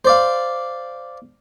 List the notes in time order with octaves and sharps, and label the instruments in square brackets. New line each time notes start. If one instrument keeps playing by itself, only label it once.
[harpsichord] C5 D5 F5